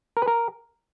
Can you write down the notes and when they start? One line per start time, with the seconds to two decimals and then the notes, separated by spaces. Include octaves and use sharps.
0.17 A#4
0.22 B4
0.28 A#4